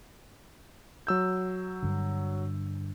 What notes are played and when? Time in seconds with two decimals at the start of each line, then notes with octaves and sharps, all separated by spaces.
1.07 F#3 E6 G6
1.83 G2 D3